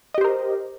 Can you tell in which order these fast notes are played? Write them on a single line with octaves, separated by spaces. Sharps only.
D#5 G4 C5 A#4